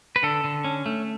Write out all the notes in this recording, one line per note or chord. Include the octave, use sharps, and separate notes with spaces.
B4
D3 A4
D3
C#4
A3